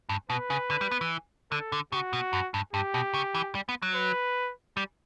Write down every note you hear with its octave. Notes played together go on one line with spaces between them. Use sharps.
G2
B2 B4
C#3
D3
G3
B3
E3
D3 A4
D3
C#3 F#4
B2
F#2
G2
G2 G4
B2
C#3
E3
G3
B3
F#3
B4
G3